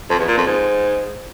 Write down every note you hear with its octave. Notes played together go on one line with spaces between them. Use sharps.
F2
E2
A#2
F2
G#2